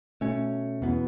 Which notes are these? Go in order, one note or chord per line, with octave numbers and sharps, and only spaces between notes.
B2 A3 C#4
E2 B2 B3